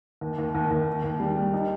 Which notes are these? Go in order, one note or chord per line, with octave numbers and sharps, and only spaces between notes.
D#2
D#2
D#2
D#2
A#3
D#2
G3
G3
D#4